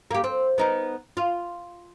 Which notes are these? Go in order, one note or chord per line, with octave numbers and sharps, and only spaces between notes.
A#3 G4
C4
B3 D#4 A#4
F4